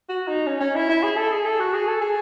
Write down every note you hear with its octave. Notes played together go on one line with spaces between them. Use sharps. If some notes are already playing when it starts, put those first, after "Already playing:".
F#4
D#4
C#4
C#4
E4
E4
G#4
A4
G#4
A4
F#4
G#4
A4
G#4